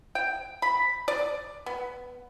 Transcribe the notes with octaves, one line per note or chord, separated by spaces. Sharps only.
G5
B5
D5
B3